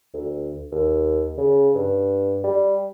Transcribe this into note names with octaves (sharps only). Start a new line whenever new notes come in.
D2
D#2
C#3
G2
G3